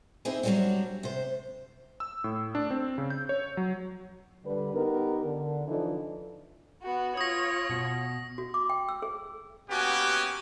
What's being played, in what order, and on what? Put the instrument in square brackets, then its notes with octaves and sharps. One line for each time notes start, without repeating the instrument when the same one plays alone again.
[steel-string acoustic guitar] C4 D#4 E4 G4 G#4
F#3 G3 A#3 C4 D4 F#4
C3 C5
[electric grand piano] E6
A2
D4
C4
C#3
G6
C#5
F#3
[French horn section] D3 G3 B4
B3 D#4 G4 A#4
D3
E3 F3 D4 D#4 A4
[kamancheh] B3 F#4
[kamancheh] F4 C#5 [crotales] D#6 A#6
[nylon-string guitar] B2
[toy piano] F#4
D6
G5
E6
G#4
[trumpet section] A#3 B3 C#4 F#4 G4 G#5